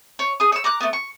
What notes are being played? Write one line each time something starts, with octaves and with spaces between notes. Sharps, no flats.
C#5
G#4 D#6
C#5 E6
A#5 D6 F#6
A3 B3
C#6